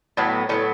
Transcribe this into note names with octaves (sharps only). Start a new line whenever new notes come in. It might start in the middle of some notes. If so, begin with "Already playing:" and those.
A2 F#3 B3
A2 F#3 B3 C#4